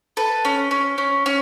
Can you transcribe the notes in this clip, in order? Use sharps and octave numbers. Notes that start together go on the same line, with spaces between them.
A4 B4
C#4
C#4
C#4
C#4